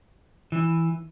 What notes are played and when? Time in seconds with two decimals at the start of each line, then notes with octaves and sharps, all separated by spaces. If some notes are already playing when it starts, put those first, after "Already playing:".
0.52 E3